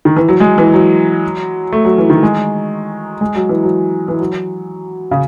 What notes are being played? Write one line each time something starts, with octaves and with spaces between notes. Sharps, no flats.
D#3
E3
F#3
G#3
E3
F#3
A3
F#3
E3
D#3
G#3
G#3
F#3
E3
F#3
E3
F#3
C#3